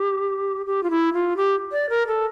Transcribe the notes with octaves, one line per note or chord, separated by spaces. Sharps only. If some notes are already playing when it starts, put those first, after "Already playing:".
Already playing: G4
G4
F4
E4
F4
G4
D5
A#4
A4